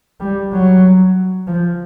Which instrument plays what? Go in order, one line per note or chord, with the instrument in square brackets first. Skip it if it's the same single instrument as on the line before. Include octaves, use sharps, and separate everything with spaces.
[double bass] G3
F#3
F3